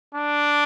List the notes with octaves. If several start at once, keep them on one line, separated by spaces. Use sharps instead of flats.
D4